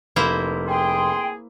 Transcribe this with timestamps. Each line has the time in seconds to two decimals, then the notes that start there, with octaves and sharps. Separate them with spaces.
0.16 F1 A#3 E4 C5 B5
0.67 G#4 G5 C6